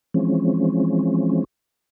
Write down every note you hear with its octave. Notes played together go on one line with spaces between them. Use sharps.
E3 F3 G#3 C4 C#4